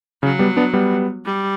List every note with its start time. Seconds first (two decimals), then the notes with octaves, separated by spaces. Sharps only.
0.23 C#3 F#3
0.39 G3 B3
0.56 B3 D4
0.73 G3 B3
1.25 G3